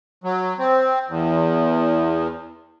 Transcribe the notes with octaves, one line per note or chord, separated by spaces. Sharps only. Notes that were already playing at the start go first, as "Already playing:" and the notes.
F#3
C4
E2